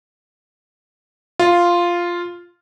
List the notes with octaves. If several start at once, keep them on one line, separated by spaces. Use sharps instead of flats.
F4